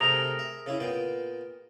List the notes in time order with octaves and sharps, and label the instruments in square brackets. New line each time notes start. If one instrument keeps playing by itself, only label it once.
[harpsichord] C3 A3 G5 [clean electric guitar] G#4 A#4 A#5
[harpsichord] E5
C#3 C#4 E4
A#2 B3 G5